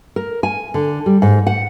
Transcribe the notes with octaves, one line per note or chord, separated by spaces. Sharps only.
A#4
G#5
D3
G3
G#2
F#5